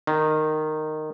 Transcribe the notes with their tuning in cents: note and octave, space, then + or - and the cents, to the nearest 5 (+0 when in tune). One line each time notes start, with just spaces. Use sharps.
D#3 -10